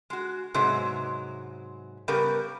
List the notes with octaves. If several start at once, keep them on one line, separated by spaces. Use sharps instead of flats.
G#3 F#4
G#2 C3 F#3 G#3 B3
C#3 G3 B3 G4 A#4